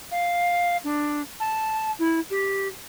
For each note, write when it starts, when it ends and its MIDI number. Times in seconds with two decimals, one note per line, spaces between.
0.11 0.77 77
0.84 1.21 62
1.40 1.91 81
1.99 2.19 64
2.30 2.67 67